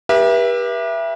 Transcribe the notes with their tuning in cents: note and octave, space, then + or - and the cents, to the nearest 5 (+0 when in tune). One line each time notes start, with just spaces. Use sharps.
G4 +15 B4 -40 E5 +15